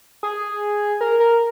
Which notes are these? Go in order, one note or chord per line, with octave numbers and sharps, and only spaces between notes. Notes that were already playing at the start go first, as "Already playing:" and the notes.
G#4
A#4
A#4